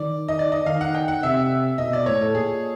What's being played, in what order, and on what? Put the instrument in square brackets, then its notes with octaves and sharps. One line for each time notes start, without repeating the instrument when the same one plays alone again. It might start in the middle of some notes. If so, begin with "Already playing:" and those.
Already playing: [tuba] D#3 [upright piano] D5
[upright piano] D#5
D5
D#5
[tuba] D#3 [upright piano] F5
[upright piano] F#5
G5
F#5
[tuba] C3 [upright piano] E5
[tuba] B2 [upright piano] D#5
[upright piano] D5
[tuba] A2 [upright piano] C#5
[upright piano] A4
[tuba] A#2 [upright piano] G#4